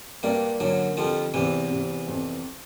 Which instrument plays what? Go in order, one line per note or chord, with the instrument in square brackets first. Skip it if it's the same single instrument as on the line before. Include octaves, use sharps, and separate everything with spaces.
[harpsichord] G2 G3 [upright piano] A#3
[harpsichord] F#2 F#3 [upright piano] D3
[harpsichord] F2 F3 [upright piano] G3
[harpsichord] E2 E3 [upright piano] C3
[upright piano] C3
F2